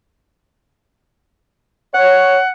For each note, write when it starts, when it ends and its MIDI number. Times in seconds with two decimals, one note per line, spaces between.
1.94 2.38 73
1.94 2.52 78